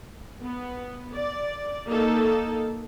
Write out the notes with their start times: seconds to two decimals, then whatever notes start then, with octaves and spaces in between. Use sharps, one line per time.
0.42 B3
1.14 D5
1.88 A#3 D#4 A4